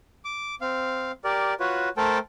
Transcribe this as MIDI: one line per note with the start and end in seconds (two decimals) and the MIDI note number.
0.25 0.55 86
0.61 1.12 60
0.61 1.12 77
1.24 1.54 67
1.24 1.54 70
1.24 1.54 74
1.60 1.89 65
1.60 1.89 66
1.60 1.89 71
1.60 1.89 73
1.97 2.19 57
1.97 2.19 69
1.97 2.19 70
1.97 2.19 72
1.97 2.19 79
1.97 2.19 81